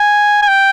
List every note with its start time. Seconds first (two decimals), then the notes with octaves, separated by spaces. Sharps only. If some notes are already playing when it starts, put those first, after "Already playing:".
Already playing: G#5
0.42 G#5
0.48 G5